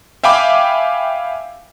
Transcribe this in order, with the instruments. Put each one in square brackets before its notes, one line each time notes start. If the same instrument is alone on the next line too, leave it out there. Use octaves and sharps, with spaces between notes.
[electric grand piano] E5 F5 G5 G#5 B5 D6